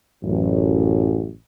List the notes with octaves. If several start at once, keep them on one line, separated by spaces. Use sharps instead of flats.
A1 F#2